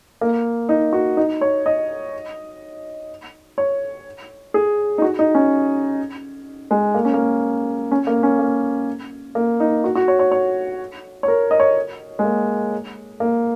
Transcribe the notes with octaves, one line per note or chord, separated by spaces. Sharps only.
A#3
D#4
F#4
D#4
C#5
D#5
C#5
G#4
D#4
F#4
D#4
C#4
G#3
A#3
C#4
A#3
C#4
A#3
C#4
A#3
A#3
D#4
F#4
F#4
C#5
C#5
C#5
C#5
A#4
D#5
C#5
G#3
A#3
A#3